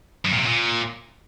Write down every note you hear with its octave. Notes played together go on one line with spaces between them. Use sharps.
F#2
A#2
C3
A#2